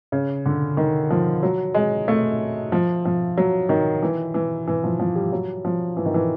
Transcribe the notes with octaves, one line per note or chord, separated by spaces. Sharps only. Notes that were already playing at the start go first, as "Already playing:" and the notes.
C#3
D3
D#3
F3
F#3
G#3
A3
F3
F3
F#3
D#3
E3
E3
E3
F3
F3
G3
F#3
F3
E3
D#3
E3